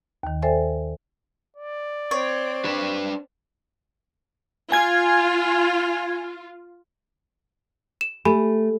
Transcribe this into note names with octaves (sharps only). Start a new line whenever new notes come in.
D#2 D#3
A4 C5 D5 E5 G5 G#5
D5
C4 C#5
D4 B4
F4 G#5 G#6
E7
A3 G4 G#5 B5